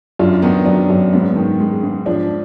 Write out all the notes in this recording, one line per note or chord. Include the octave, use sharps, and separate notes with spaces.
F#2 D4 F4
D#3 B3 D#4
F#3 D4
F#2
G#2 B3
D#3
G#3
G#2
F3 D4